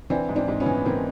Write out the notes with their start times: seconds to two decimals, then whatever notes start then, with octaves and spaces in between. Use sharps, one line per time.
0.10 E3 C4 D4
0.29 G#2
0.36 C4 D4
0.48 G#2
0.60 B3 C#4
0.66 E3
0.85 E3 A#3 C4